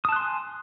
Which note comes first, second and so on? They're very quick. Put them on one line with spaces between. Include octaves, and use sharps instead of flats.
D#6 A5 F#6 C6 G#5